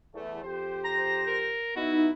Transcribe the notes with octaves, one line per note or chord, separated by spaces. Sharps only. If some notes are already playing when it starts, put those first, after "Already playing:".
E2 A3
F2 G4 C5
A#5 A#6
A#4
B3 D#4 E4 F#4